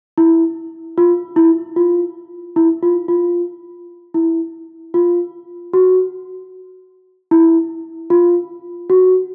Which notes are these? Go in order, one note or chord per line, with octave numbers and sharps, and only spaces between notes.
E4
F4
E4
F4
E4
F4
F4
E4
F4
F#4
E4
F4
F#4